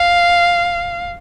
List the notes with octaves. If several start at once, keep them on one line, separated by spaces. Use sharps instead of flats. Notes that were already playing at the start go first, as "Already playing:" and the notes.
Already playing: F5